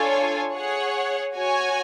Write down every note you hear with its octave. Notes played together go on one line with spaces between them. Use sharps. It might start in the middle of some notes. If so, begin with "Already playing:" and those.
Already playing: D4 F4 A4 C#5 G#5
G#4 C#5 F#5
F#4 C#5 G#5